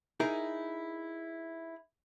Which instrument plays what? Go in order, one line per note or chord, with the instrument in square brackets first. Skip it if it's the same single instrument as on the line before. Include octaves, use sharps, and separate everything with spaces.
[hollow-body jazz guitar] D#4 E4 G#4 A#4